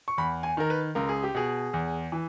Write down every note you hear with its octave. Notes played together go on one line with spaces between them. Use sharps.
C#6
E2 B5
G#5
D#3 A#4
B4
C#2 A#4
G#4
G4
B2 G#4
E2
E3